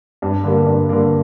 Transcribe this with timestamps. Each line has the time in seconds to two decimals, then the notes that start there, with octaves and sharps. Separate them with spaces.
0.22 G2
0.43 D3 G3 A#3
0.66 G2
0.89 D3 G3 A#3